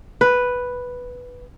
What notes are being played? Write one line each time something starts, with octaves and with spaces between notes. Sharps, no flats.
B4